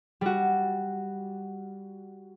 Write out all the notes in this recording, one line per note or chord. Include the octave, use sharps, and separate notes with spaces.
G3 F#4